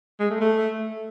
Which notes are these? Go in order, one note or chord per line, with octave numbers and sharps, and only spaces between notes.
G#3
A3
A3